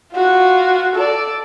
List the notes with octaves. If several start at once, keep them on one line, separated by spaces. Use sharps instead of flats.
F4 F#4
A4 D5